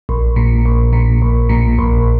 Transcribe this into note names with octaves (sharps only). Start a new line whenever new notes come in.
A#1
A#2
A#1
A#2
A#1
A#2
A#1